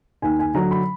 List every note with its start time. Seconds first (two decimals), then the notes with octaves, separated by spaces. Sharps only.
0.22 D#2 G#5
0.39 G#5
0.54 D3 F#3 A#5
0.71 B5